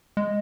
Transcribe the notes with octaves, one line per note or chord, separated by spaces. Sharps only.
G#3